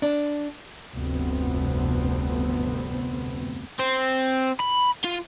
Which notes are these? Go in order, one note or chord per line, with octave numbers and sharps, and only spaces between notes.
D4
F1 D2 G2 B3 C4
C4
B5
F4